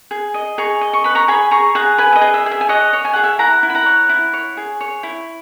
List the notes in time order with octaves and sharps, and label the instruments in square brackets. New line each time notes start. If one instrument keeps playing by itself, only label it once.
[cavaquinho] G#4
D#5
G#4 A#5 C#6
D#5
C#6
B4 B5
A#5 C#6
G#4 G#5 B5
G#4 A#5 C#6
G#4 F#5 A#5
B4 G#5 B5
E5
D#5
G#4
E5
G#4
E5
G#5
C#5 D#5 F#5
C#5
G#5
G#4 F#5
E5 G#5
E4 F#5 A#5
E4
B5
F#5 A#5
C#5
E4
C#5
G#4
C#5
E4